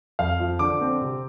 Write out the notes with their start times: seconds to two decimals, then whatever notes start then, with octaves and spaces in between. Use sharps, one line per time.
0.19 F2 F5
0.40 F3
0.59 D3 D6
0.81 C4
1.01 C3